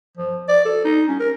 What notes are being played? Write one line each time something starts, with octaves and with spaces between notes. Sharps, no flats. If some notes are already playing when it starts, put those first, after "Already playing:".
F3
D5
A4
D#4
C#4
A#4